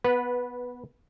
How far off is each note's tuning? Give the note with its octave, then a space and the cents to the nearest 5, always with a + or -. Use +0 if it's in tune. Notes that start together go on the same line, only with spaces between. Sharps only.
B3 +0 B4 -10 F#5 -25